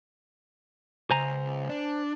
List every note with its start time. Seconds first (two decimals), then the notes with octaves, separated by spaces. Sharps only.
1.11 C#2 C5 G#5 A#5
1.69 D4